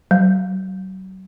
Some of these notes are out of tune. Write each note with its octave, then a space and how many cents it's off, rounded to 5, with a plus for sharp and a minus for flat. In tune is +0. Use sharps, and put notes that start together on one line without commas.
F#3 +35